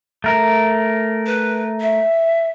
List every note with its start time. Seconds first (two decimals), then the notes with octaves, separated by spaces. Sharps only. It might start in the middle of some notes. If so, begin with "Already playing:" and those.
0.24 A3 A#4
1.26 B4
1.80 E5